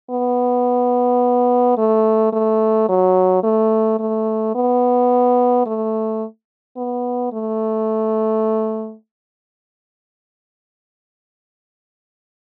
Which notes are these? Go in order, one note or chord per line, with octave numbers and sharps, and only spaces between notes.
B3
A3
A3
F#3
A3
A3
B3
A3
B3
A3